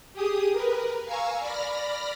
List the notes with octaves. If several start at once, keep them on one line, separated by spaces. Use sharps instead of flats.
G4 G#4 D#6
A#4 B4
F5 G#5 A#5 C#6 E6
D5 B5 F6 A#6